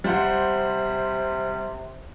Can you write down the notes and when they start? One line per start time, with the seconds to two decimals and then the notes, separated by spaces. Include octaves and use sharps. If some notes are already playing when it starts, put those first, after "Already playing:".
0.04 C3 G3 C5 F#5